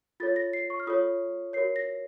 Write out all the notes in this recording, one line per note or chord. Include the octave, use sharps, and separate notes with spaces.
F4 A4 C#5 A6
A#6
C7
C#6
F6
F4 A4 C#5 D#6
F#4 A#4 C#5 C7
A#6